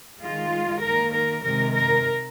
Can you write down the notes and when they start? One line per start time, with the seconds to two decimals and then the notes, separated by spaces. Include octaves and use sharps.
0.20 D#3 G#3 F4
0.82 D#3 A#3 A#4
1.12 A#4
1.43 C3 D#3 G#3 A#4
1.74 A#4